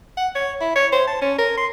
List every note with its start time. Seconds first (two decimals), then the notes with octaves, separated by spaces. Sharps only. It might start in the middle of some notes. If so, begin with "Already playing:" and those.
0.17 F#5
0.35 C#5
0.61 E4
0.76 C#5
0.93 C5
1.07 A5
1.22 C#4
1.38 A#4
1.57 C6